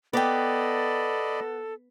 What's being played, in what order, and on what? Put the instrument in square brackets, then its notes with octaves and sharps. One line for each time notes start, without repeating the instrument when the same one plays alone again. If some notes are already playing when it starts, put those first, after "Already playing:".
[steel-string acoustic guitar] B3 [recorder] A4 [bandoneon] D5 D#5 B5 [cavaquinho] G5 D6